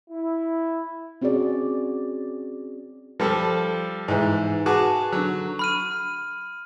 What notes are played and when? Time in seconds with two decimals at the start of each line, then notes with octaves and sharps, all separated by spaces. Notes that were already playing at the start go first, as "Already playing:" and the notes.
0.10 E4
1.21 C4 C#4 F#4 G#4 D5
3.20 F3 G3 A4
4.08 G#2 E3
4.66 F#4 G#4 B4 A5 D6
5.12 D3 F#3
5.59 B5 F6 D#7